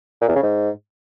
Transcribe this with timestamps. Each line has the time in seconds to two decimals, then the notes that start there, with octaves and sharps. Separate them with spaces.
0.21 A#2
0.28 E2
0.35 C#3
0.43 G#2